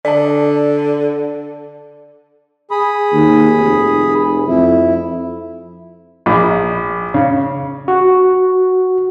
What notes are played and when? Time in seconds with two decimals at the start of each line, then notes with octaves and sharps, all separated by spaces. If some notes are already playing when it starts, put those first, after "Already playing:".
0.05 D3 D5 A5
2.71 G#4 B5 D#6
3.13 D#2
3.55 F1
4.48 F2 E4
6.26 A#1
7.14 C#3
7.88 F#4